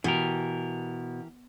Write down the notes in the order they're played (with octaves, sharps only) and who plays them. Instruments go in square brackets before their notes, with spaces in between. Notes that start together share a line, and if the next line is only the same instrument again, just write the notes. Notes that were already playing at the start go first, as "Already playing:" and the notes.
[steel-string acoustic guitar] B2 [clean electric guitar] E3 G4 A#4